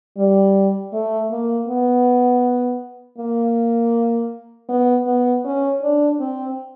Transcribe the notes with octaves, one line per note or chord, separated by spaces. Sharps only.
G3
A3
A#3
B3
A#3
B3
B3
C#4
D4
C4